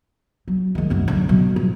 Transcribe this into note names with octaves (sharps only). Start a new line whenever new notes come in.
F#3
D#3 G#3
C2 F#2
D3 F#3
B2 F#3
F3